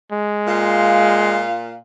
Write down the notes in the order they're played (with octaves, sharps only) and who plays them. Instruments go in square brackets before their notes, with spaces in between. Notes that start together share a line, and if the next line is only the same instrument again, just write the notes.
[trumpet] G#3
[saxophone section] A#2 F4 F5